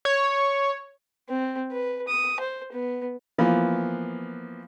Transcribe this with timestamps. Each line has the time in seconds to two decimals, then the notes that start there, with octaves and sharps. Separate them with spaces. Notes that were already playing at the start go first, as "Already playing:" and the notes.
0.05 C#5
1.29 C4
1.72 B4
2.08 D#6
2.40 C5
2.72 B3
3.38 E3 F3 A#3 B3